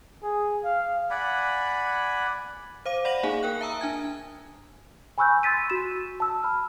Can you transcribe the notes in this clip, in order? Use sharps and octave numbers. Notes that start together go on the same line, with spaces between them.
G#4
F5
D5 F#5 G#5 B5
C5 F5 D6 D#7
D5 F#5 B5 A#6 D#7 F#7
A#3 D#4 G#4 F5 G#5
A#4 G5 F#6
E5 A5 A#5 D#6 E6
D4 G#5 G#6
G#5 B5 C#6 E6 F#6 G6
C6 E6 A6 B6 D#7
F#4 E7
A5 E6
B5 F6